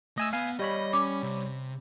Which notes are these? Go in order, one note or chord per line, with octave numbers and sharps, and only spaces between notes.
A3 D#5 G#5 E6
B3 F5 G#5
G3 C#5 D#5 B5
C#4 D6
C3